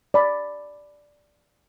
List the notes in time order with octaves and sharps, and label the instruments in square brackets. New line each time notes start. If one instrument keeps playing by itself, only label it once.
[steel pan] D5 B5